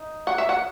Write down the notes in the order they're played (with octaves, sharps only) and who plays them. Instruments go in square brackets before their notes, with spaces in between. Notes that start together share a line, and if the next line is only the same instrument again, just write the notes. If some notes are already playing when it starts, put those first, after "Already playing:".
Already playing: [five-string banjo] D#4
F#5
E5
F#5